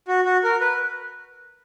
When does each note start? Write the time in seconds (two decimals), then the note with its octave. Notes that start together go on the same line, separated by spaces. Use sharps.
0.08 F#4
0.25 F#4
0.44 A#4
0.61 B4